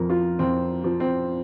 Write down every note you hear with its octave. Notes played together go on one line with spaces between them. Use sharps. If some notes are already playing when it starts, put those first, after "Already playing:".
Already playing: F2 F3 A#4
F4
F2 C4
F3
C4